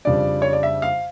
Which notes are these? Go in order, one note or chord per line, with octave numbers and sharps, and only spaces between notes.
F2 C#3 G3 D4 D5
C#5
D5
E5
F5